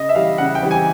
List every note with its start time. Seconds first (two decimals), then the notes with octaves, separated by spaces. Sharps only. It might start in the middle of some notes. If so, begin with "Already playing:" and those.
Already playing: C#3 D#5
0.09 E5
0.15 E3 G3 F5
0.38 C#3 F#5
0.55 G5
0.63 E3 G3
0.71 G#5